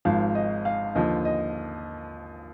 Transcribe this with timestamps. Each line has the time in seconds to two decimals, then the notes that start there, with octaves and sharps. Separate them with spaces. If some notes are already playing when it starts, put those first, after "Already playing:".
0.05 G#1 G#2 F3 F5
0.35 D#5
0.65 F5
0.95 D#2 D3 F3 D#5
1.25 D#5